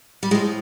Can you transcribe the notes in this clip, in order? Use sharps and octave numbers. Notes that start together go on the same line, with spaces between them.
G3
A2 F3 G#3